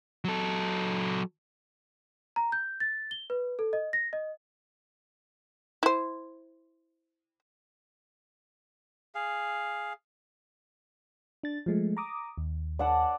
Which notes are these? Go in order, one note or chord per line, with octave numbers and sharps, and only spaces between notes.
F#3 A4
A#5
G6
A6
G7
B4
A4
D#5
A#6
D#5
E4 C5
G#4 F5
D4 A6
F3 G#3 A3
A#5 D6 D#6
D#2
D5 F#5 A5